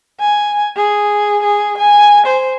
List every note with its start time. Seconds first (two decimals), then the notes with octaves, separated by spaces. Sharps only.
0.20 G#5
0.76 G#4
1.43 G#4
1.78 G#5
2.27 C5